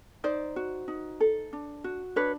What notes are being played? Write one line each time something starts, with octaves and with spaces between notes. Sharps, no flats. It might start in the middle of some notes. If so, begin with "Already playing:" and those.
D#4 C5 D5
F#4
D#4
A4
D4
F#4
D4 B4 C#5